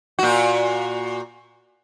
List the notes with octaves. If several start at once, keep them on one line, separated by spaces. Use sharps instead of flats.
A#2 F#4